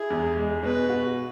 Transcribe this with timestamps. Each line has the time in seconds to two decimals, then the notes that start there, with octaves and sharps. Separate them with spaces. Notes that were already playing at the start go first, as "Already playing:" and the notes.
Already playing: E4 G#4
0.10 E2
0.37 G#3
0.63 B2 B4
0.89 F#4